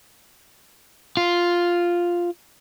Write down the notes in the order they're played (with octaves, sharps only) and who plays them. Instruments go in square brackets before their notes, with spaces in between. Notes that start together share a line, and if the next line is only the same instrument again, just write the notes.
[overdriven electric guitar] F4